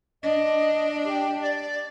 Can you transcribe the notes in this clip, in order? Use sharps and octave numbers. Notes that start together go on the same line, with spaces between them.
D4 D#5
G4
D5